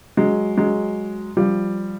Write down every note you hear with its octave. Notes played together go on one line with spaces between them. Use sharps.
F#3 G#3
F#3 G#3
F3 G3